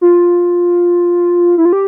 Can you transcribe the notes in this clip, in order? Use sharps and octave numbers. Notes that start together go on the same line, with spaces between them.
F4
E4
F4
G4